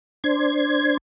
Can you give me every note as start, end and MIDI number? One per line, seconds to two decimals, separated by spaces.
0.24 0.97 62
0.24 0.97 72
0.24 0.97 92